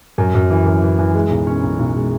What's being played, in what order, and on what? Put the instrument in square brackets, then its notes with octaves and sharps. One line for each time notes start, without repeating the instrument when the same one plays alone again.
[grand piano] F#2
F#2
E3
F#2
E3
E3
G#3
B1
C#4
B1
B1
G#3